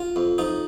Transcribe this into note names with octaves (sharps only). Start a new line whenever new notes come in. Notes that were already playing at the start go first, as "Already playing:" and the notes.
Already playing: F4
F2
F3 D#4